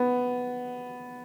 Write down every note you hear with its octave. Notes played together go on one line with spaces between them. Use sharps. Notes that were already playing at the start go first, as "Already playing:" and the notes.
Already playing: B3